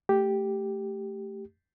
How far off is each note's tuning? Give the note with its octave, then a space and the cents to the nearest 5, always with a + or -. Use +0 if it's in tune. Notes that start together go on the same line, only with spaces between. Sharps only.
A3 +0 G4 +0